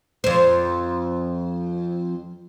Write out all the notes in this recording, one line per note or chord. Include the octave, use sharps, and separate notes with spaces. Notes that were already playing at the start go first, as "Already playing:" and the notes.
F2 C5